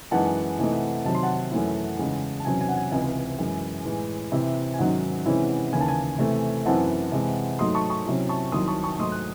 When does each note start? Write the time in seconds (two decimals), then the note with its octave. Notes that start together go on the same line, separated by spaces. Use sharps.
0.11 F#2 E3 G#3 D#4 F#5 A5
0.58 C3 E3 A3 D#4
1.05 C3 D#3 F#3 A5
1.15 C6
1.23 F#5 A5
1.51 F#2 E3 A3 C#4 E4
1.99 E2 C#3 G#3 D#4
2.40 A5
2.45 E2 C3 F#3 C#4 G#5
2.61 G#5
2.69 F#5
2.77 G#5
2.91 C#2 C3 E3 C4 D#4 G#5
3.39 F#2 E3 G#3
3.85 A2 E3 G#3
4.32 C3 E3 C4 E4
4.74 G#5
4.79 G#2 D#3 F#3 C#4 F#5
5.25 C3 E3 G#3 C#4 E4
5.72 D#2 C#3 E3 G#5
5.81 A5
5.88 G#5
6.19 C3 E3 A3
6.66 F#2 E3 C4 E4 F#5 A5
7.12 C3 E3 G#3
7.59 G#2 F#3 A3 D#4 C6 D#6
7.75 A5 C#6
7.90 A5 C#6
8.06 C3 F#3 C#4 E4
8.29 A5 C#6
8.52 C2 C3 D#3 F#3 C6 D#6
8.68 A5 C#6
8.83 A5 C#6
8.99 G#2 F#3 A3 D#4 C6 D#6
9.12 F#6